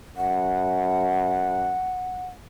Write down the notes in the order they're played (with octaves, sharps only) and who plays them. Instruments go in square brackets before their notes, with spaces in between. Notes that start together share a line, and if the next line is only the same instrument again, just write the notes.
[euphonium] F#2 [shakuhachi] F#5